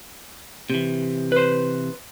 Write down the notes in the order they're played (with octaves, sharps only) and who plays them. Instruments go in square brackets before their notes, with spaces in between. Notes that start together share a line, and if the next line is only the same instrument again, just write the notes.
[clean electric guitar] C3 E3
[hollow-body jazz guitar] B4 C5